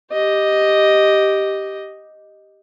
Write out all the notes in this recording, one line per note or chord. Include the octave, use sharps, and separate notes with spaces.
G4 D#5